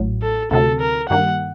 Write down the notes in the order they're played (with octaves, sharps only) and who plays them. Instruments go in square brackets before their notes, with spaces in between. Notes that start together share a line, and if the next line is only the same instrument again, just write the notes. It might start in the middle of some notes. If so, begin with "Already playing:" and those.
Already playing: [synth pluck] A1 A2 F#3
[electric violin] A4
[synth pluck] D2 C3 F#3 [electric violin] A4
[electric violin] A#4
[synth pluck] G2 D#3 G3 A#3 [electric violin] F#5